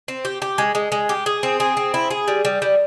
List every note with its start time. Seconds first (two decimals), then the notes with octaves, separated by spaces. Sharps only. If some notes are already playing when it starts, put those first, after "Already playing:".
0.08 C4
0.25 G4
0.42 G4
0.58 G#3
0.75 G#3
0.92 G#3
1.09 G4
1.26 G#4
1.43 C4
1.60 G#4
1.77 C4
1.94 E4
2.10 G#4
2.28 G3
2.45 G3
2.62 G3